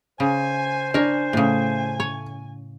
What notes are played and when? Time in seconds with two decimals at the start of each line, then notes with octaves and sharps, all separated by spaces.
0.20 C#3 C5 G#5
0.94 D4 A#4 C#5 G#5
1.33 A2 C#3 A3
2.00 C#5